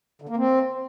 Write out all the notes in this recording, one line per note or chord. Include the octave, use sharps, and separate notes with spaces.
D3
A#3
C4